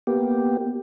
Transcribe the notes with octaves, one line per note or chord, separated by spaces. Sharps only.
A#3 B3 G4